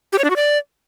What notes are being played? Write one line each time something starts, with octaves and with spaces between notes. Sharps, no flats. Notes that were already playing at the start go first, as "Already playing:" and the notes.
G4
C#5
D4
F#4
D5